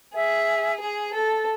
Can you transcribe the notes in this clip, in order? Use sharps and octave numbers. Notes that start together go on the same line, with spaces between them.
G#4 E5
G#4
A4